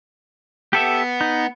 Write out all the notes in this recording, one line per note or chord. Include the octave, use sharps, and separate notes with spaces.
B3 G4 A4 E5
D#4